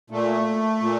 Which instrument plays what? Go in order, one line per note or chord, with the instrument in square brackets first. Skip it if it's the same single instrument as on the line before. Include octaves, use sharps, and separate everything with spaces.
[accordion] A#2 A3
A#2